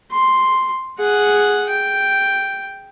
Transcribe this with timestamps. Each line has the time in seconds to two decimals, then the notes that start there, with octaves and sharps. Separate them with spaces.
0.11 C6
0.99 G#4 F#5
1.70 G5